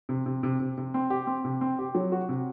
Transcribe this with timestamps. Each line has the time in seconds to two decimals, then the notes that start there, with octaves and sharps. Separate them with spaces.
0.09 C3
0.26 C3
0.43 C3
0.60 C3
0.78 C3
0.94 C4
1.10 G4
1.27 C4
1.45 C3
1.61 C4
1.79 G4
1.95 F#3
2.12 F#4
2.29 C3